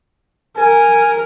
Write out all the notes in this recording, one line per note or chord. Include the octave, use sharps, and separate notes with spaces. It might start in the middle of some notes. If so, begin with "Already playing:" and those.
A#4 G#5